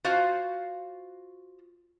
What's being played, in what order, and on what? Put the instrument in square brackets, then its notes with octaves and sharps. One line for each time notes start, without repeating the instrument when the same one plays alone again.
[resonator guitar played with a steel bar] F4 F#4 C5 F5